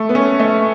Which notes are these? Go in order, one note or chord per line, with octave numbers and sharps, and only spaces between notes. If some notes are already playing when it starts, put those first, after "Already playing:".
Already playing: A3
B3
C#4
A3